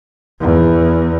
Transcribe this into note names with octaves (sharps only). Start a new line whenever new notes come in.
E2